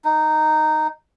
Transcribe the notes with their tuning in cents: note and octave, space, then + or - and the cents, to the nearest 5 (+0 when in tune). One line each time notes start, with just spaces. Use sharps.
D#4 -10